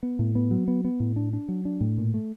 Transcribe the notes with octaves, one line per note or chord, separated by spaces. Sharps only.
B3
A2
B3
F#3
B3
B3
A2
D4
D4
F#3
D4
A2
A#2
A3